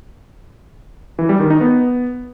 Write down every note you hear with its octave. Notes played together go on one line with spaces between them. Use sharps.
E3
G3
D#3
D#4
B3